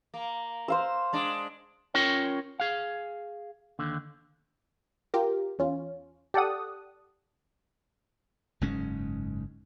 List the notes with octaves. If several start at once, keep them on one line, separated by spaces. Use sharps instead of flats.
A#3
C5 F5 E6
G#3 D4
C#4 F4 A#4 C#5 G5
G#4 F5
D#2 D3
F4 G4 A#4
E2 C#4 F4
G4 A4 D5 F#5 D#6
F#1 G#2 G#3 C#4